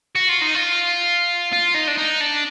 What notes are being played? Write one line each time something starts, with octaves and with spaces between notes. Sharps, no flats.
F#4
F4
D#4
F4
F4
D#4
D4
D#4
D4